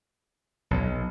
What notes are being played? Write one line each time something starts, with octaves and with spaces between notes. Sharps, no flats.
B1